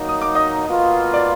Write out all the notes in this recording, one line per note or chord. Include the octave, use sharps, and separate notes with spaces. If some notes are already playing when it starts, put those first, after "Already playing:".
Already playing: F#3 A#3 D#4
D#6
D6
D#5 D#6
B2 A#3 F4
D5 D6